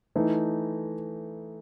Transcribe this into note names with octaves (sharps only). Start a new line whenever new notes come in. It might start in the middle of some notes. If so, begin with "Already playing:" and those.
E3 A3 D#4